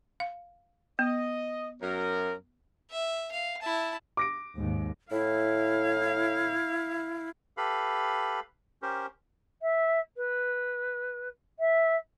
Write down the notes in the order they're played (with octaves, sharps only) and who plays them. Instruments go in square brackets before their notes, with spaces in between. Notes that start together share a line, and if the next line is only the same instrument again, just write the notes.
[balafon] F5
[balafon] B3 [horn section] D#5
[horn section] F#2 A#4
[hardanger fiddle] E5
F5
E4 A5
[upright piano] D6 A#6 D7
[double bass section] D#2 G#2
[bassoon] A2 [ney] E4 [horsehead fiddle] F5
[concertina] G4 A4 B4 F5 B5
C#4 G4 A#4 C5
[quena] E5
B4
E5